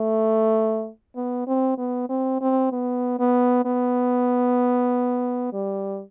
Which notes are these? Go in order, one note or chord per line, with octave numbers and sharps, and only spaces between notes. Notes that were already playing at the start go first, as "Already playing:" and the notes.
Already playing: A3
B3
C4
B3
C4
C4
B3
B3
B3
G3